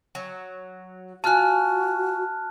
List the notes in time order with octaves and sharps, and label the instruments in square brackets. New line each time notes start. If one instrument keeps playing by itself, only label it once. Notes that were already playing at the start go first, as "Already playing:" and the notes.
[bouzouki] F#3
[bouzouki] F4 G#5 [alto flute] F#4 [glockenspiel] A5 F6 F#6